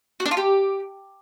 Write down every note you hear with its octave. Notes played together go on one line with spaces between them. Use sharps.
F#4
D4
F4
G4